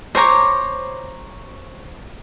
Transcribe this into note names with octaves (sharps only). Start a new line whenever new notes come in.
C5 C#5 A#5 D6